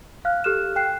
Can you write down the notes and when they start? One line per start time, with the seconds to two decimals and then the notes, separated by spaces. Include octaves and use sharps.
0.25 F5 F6 F#6
0.44 G4 A4 F6 F#6 E7
0.76 G5 F#6 C7